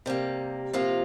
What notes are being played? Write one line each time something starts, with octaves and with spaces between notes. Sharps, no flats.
C3 G3 A#3
C3 F3 A#3 F4